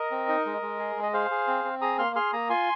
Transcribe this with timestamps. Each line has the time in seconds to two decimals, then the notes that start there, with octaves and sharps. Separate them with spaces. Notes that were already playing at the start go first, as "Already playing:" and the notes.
Already playing: A#4 D#5
0.11 C4
0.28 D#4
0.46 G#3
0.62 G#3
0.79 G#4
0.96 G#3
1.03 D#5
1.13 G#4 C5 F5
1.31 G#4
1.47 C4
1.64 C4
1.82 G#4 A#5 D#6
1.98 A#3 C6 F6
2.16 G#4 C6 F6
2.33 A#3 A#5 D#6
2.50 F4 G#5 C6